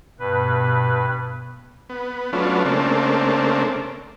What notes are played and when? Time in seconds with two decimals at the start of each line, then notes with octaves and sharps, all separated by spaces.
0.19 G2 B2 B4
1.89 B3
2.33 F#3 A3 B3 C#4 D4 F4
2.65 C#3 A3 A#3 C4 D4